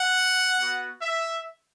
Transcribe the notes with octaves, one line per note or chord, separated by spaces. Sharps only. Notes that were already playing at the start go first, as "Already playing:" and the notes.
Already playing: F#5
B3 F#4
E5